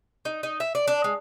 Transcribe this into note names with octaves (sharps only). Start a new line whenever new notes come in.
D#4
D#4
E5
D5
D4
G#3